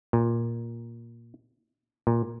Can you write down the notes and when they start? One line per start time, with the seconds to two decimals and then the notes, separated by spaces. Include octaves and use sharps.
0.13 A#2
2.07 A#2